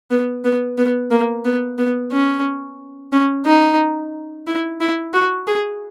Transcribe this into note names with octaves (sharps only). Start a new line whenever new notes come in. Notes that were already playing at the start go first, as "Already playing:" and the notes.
B3
B3
B3
A#3
B3
B3
C#4
C#4
D#4
E4
E4
F#4
G#4